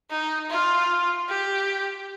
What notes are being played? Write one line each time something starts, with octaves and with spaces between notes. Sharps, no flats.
D#4
F4
G4